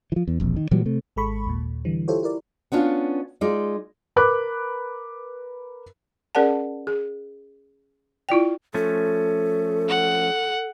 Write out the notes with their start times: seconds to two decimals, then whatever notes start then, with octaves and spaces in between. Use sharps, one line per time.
0.12 E3 F3
0.28 E2
0.40 E1 A#1 F2
0.56 D#3
0.71 A#2 E3 F#3 G3
0.86 C3 A3
1.16 G#1 G#3 A4 B5 C#6
1.46 D#2 A#2
1.85 D3 E3 G3
2.08 E4 F4 G4 A4 C5 C#5
2.23 E4 A#4 D5
2.72 B3 C#4 D4 F4
3.41 G#3 D#4 F4 D5
4.16 A#4 B4 B5 D6 F#6
6.35 C#4 G#4 A#4 D5 F#5 A5
6.87 G#4
8.29 E4 F4 D5 G5
8.74 F3 A3 C#4 A4
9.88 F#5